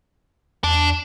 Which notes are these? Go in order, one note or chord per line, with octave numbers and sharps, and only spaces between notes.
E2 D4